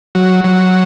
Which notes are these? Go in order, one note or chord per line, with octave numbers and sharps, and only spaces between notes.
F#3
F#3